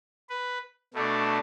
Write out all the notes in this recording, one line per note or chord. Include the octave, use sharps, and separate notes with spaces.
B4
B2 A3 D4